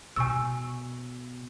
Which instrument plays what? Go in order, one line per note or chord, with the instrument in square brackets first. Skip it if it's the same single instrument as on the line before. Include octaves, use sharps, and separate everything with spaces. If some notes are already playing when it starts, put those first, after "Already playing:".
[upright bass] B2 [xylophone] G#5 C#6 E6